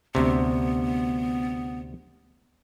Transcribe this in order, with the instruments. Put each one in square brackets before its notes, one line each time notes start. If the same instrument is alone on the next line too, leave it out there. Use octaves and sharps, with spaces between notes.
[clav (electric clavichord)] D2 C3 [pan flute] B3